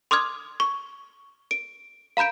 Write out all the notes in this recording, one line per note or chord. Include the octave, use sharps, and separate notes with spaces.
C6 D6 D#6 F6 G#6
C#6
D7
F5 A#5 B5 G6 D7